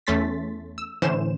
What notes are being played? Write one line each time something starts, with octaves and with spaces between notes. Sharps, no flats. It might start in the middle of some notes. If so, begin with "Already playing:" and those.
E2 A3 C#4 C6 A6 B6
E6
A2 D3 E3 C#4 C5 E7